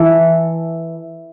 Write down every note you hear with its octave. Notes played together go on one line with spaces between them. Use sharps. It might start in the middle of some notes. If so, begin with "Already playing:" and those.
Already playing: E3 A4